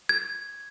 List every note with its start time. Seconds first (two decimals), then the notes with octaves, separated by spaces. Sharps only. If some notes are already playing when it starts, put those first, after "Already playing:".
0.09 G#6